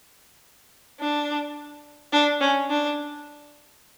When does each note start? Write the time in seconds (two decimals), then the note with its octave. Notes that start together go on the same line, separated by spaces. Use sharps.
1.00 D4
2.13 D4
2.41 C#4
2.70 D4